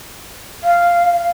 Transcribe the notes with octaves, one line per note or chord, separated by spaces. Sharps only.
F5